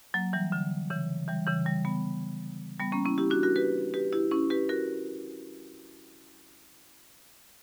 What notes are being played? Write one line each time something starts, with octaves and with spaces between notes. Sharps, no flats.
F#3 A#3
E3 G3
D3 F#3
C#3 E3
E3 G3
C#3 E3
E3 G3
G3 B3
G3 B3
A#3 C#4
C#4 E4
E4 G4
D4 F#4
F#4 A#4
G4 B4
G4 B4
E4 G4
C#4 E4
G4 B4
F#4 A#4